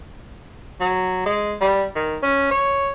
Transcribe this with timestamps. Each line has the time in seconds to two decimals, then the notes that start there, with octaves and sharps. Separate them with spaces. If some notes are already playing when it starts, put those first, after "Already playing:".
0.81 F#3
1.26 G#3
1.61 G3
1.95 D#3
2.23 C#4
2.51 C#5